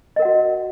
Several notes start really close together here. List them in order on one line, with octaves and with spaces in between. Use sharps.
D#5 A#4 F#5 F#4